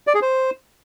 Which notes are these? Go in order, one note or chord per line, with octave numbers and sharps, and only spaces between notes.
D5
G#4
C5